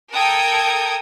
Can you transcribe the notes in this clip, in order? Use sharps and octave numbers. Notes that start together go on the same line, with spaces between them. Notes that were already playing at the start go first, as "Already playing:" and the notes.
A4 A#4 G5 D#6 G#6